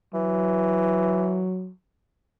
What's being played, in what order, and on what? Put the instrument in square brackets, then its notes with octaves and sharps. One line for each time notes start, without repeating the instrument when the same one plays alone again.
[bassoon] E3 [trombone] F#3